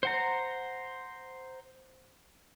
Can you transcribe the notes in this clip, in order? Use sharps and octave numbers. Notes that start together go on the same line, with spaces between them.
C5 F#5 A#5